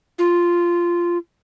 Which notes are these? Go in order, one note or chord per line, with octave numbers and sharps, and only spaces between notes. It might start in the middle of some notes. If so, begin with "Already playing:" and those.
F4